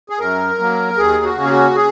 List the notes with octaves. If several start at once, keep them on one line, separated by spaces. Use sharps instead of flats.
G#4
F#2 A#4
F#3 A#3
D#2 G#4
F#4
C#3 A#3 C#4
G#4
F#4
G#4